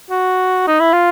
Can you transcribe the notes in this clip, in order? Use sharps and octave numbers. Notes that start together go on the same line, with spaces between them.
F#4
D#4
E4
F4